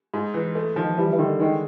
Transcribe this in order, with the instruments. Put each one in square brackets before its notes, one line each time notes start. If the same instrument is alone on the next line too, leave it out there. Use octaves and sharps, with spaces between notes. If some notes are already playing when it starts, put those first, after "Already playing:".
[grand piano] G#2
E3
A3
[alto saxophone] D#3 [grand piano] F3
[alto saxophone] E3 [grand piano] G3
[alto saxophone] E3
[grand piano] D3 [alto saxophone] D#3
[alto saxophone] D#3 [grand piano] G#3